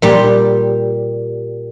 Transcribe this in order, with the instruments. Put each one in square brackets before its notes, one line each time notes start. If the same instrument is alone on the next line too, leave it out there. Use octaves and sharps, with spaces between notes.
[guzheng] A#2 G3 G4